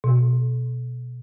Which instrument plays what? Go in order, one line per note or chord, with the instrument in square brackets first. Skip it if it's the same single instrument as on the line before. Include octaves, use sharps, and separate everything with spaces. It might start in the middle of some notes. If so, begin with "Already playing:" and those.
[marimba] B2